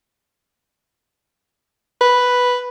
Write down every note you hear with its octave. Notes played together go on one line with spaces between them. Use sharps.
B4